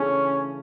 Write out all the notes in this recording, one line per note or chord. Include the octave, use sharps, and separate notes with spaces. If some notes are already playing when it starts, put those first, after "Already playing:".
Already playing: C#3 E3 A3 C#4 D4 A4